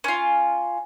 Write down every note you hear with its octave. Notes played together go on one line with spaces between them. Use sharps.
C#4 F4